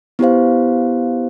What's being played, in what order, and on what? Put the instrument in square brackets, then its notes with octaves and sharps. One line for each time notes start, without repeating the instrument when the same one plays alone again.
[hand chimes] B3 E4 G4 C5 F5